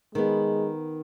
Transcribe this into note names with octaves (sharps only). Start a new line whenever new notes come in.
D#3 G#3 B3